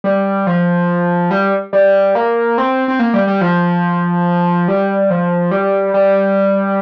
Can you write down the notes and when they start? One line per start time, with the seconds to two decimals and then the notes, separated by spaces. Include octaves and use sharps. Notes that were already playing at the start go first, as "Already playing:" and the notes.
0.04 G3
0.47 F3
1.31 G3
1.73 G3
2.15 A#3
2.58 C4
2.88 C4
2.99 A#3
3.14 G3
3.27 G3
3.41 F3
4.68 G3
5.10 F3
5.51 G3
5.94 G3